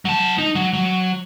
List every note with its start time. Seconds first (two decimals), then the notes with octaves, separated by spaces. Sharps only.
0.05 F#3 A5
0.38 D#4
0.55 F#3
0.73 F#3